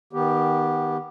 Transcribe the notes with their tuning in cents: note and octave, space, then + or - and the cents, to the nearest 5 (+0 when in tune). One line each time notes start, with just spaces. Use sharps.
D#3 +5 B3 -15 G4 +0